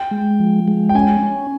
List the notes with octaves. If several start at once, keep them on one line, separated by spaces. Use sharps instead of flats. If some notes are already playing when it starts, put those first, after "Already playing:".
Already playing: G5
G#3
F3
G#3
G5
C#4 G#5
C#4